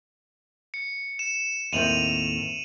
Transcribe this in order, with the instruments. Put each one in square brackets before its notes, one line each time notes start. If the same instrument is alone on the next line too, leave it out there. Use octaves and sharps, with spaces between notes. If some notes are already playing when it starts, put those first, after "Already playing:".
[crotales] C#7
E7
[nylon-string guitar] D#2 A2 C4 [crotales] D#7 F7 F#7